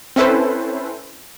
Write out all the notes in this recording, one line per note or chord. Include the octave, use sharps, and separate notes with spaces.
C4 C#4 E4 A4 B4 C5